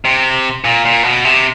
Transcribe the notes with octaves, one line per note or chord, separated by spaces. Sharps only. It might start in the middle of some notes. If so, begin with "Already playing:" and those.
C3
A#2
A#2
B2
C3